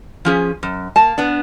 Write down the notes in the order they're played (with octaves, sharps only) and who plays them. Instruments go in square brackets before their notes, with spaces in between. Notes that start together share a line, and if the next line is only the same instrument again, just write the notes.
[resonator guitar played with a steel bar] F3 C#4 G#4
F#2
[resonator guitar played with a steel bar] A#3 [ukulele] A5
[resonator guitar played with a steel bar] B3 D4